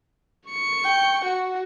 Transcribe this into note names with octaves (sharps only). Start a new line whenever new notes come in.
C#6 C#7
G5
F#4